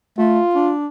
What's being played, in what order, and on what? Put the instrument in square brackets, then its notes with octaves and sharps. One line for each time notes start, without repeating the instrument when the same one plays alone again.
[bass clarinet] A3 [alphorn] F4
[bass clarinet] D4